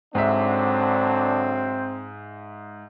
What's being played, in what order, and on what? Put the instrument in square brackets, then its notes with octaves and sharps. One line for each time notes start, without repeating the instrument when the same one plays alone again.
[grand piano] G#2 E5 [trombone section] D3 F#3 D4 [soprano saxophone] C4